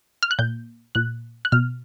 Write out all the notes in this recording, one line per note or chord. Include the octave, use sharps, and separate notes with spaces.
F6
F#6
A#2 G6
A#2 F#6
F#6
B2 F6